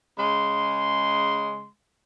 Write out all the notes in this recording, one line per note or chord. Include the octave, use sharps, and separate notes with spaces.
C#3 G#3 C6